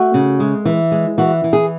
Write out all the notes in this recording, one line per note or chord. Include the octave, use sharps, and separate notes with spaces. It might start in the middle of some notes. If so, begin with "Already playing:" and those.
Already playing: A3 F#4
C#3
G#3
E3
G#3
E3 F#4
E3
G#4